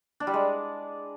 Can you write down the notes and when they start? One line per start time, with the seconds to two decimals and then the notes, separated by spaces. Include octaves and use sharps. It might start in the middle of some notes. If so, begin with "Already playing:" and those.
0.20 D4
0.27 G3
0.34 G#3